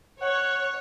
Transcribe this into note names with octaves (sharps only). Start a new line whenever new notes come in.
C#5 F#5